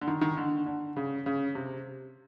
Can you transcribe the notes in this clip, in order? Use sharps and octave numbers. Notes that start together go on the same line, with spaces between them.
D3
D#3
D#3
D3
D3
C#3
C#3
C3